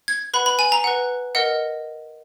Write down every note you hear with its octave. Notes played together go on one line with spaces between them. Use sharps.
G#6
B4 F#5 B5
B5
G#5
A#5
B4 F#5
A#4 D#5 F#5